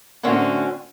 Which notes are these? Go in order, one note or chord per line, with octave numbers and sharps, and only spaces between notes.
A2 D3 C4 C#4 F#4